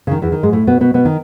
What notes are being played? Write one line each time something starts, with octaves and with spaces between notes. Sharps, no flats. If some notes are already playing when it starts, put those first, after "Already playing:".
C#3
D#3
E2 E3
D#3
G#2 G#3
A2 A3
B2 B3
B2 B3
B2 B3
D#3